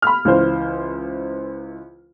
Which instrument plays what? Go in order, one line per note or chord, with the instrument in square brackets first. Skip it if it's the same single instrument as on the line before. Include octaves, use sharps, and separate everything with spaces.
[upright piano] B5 F6
C#2 E3 C5